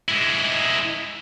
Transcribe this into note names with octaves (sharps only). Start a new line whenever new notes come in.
G#3 E4